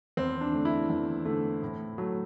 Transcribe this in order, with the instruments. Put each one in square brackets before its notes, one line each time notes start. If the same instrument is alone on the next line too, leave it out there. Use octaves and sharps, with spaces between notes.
[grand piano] E2 C4
D4
D3 A3
E4
E2
D3 A3
A2
F#3 A3